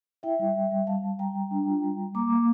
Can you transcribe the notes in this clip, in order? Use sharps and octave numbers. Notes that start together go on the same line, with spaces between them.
E4 E5 G5
G3
G3
G3
G3 F5 A5
G3
G3 G5 A#5
G3
D4
F4
G3
G3
A#3 A#5 D6
A#3